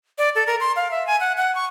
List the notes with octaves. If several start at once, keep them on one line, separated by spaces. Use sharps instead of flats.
D5
A4
A#4
C6
F5
E5
G#5
F#5
F#5
C#6